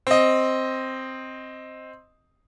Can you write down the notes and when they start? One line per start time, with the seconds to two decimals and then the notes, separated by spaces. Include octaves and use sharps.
0.07 C4 D#5